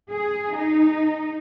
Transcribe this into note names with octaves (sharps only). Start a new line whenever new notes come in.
G#4
D#4